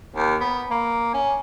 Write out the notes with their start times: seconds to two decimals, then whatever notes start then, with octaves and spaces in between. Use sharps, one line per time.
0.16 D#2
0.41 B3
0.71 A#3
1.14 C#4